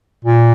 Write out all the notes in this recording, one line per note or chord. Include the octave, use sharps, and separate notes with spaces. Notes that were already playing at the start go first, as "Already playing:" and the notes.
A#2